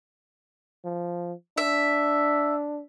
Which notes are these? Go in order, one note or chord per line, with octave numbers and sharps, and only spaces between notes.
F3
D4 E5